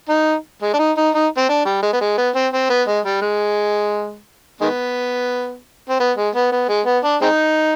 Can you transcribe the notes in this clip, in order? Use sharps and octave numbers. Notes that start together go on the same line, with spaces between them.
D#4
G#3
D4
D#4
D#4
D#4
C4
D4
G3
G#3
B3
G#3
B3
C4
C4
B3
G#3
G3
G#3
D#3 G#3 B3
C4
B3
G#3
B3
B3
G#3
B3
D4
G#3 C4 D#4